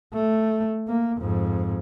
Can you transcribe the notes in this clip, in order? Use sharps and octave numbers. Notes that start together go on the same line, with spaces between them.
A3
A#3
F2 G#2